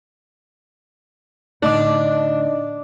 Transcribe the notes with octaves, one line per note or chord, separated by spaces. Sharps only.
A2 D3 D4 D#4 D#5 D6